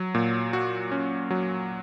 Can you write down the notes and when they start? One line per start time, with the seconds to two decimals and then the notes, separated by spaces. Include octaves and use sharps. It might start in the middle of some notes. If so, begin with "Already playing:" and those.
Already playing: F#3
0.15 A#2
0.53 F#4
0.91 C#4
1.30 F#3